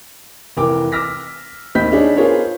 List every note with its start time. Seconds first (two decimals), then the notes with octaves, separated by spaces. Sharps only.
0.57 F1 E3 A#4 G5 D6
0.92 D6 E6 F6 A#6 B6
1.75 D#2 C4 D#4 B5 G6 B6
1.92 D4 D#4 G#4 C#5
2.17 B3 F4 G#4 A#4 C5 C#5